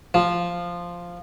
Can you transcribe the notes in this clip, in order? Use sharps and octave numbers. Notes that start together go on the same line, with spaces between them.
F3